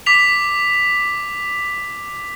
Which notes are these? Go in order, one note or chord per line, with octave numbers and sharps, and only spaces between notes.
D6 B6 F7